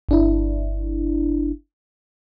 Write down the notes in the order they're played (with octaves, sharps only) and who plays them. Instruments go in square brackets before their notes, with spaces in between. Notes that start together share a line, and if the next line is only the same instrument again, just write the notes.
[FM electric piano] G1 D4 E4